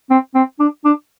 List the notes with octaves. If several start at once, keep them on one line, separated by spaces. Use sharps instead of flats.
C4
C4
D4
D4